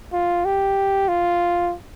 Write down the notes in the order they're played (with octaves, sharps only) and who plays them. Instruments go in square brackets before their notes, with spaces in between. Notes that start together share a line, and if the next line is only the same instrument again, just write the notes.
[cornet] F4
G4
F4